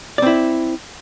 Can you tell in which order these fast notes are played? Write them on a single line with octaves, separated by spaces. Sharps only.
D5 C4 E4